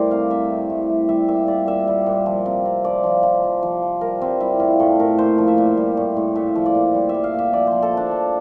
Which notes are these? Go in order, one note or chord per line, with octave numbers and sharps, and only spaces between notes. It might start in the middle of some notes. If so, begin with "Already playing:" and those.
Already playing: A2 G3 A#4 C5 D5
C3 F5
C3 E5
A2
A2
G3
G3 E5
A#2 E5
G3 D5
A#2 E5
G3
A#2
F3
C3
C3
F3 D5
F3
F3
F3
F3
F3
G3 A#4
G3 C4
G3 E4
A2 F4
A2 A4
A2 A#4
A#2 C5
F3
E5
A#2
G3
A2
A2
A#2 E5
F3
D5
A#2
G3
E5
G3
F5
A#2 E5
F3 D5
F3 C5
A4
F3
D4
F3